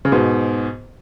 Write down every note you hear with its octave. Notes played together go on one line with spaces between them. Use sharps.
C#3
G#2 B2